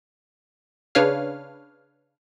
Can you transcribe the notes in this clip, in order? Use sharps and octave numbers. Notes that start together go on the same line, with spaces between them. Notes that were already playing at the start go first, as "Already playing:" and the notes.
C#3 D4 B4 C#5 F5 F6